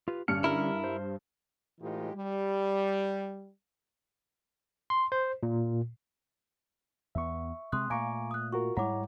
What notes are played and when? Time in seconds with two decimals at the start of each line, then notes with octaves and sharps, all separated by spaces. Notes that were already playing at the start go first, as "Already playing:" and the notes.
0.08 F4 G4 B4
0.28 G2 D3 C#4 D4 F6 C#7
0.44 E4 A#4
0.84 C5
1.81 A2 E3 G#3 D#4 F4 G4
2.15 G3
4.90 C6
5.12 C5
5.43 A#2
7.15 E2 B3 E5 C#6
7.72 C3 G#3 C4 C6 D#6 F#6
7.90 A#2 A3 F5 G#5 A#5 C#6 D6 D7
8.31 D#6 F#6
8.52 F4 F#4 A#4 C#6
8.77 G#2 G3 G#3 E4 C#5 F#5 A#5 D6